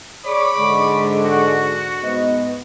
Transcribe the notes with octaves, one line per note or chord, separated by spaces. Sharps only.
G#4 C#5 D5 B5 C#6 D6
G#2 D3 G#3
F#4
G#2 B3 D#5